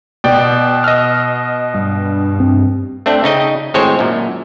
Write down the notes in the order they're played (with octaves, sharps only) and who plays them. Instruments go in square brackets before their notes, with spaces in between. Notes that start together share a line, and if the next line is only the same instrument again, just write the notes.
[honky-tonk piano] B2 [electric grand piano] D5 G5
[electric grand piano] D#5 E6 F6
[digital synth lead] G2
[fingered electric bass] C4
[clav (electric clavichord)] A3 C4 D4
C#3 D#4 D#5 G5
G#1 A2 G#3 C4 C5 C#5
F#2 A#2